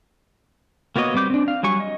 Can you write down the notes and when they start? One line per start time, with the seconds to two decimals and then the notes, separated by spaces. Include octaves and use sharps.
0.96 A#3 B3 F#4 C#5 D#5
1.14 G3 B3 C4 D6 G6
1.30 C4 D4
1.48 F5
1.63 F#3 G3 G#5 C#6
1.80 D#5